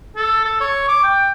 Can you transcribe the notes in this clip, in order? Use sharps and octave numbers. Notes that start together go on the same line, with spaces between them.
A4
A4
C#5
D6
G5